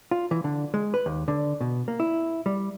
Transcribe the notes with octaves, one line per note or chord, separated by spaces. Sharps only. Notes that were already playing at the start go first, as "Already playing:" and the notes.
F4
E3
D3
G#3
B4
D#2
D3
B2
A#3
E4
G3